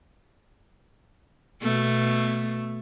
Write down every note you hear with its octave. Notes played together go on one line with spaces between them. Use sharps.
B2 A3